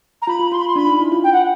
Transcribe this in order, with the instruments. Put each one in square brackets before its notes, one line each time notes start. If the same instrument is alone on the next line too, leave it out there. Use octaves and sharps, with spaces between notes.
[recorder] A#5
[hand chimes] F4 [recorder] B5
[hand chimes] F4
[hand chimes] F4 [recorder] C6
[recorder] B5
C6
[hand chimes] D4 [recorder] B5
[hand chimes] D#4
E4
F4
[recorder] G5
F#5